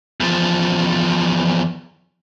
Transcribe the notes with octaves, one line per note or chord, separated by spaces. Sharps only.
E2 F3